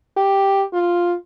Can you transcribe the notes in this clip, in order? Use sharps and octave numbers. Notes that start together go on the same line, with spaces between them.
G4
F4